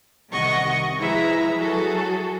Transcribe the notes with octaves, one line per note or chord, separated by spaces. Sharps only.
C2 C3 D#3 D#5 F#5 C#6
F3 G#3 E4 B4 E5 A#5
F#3 F#4 G#4 A4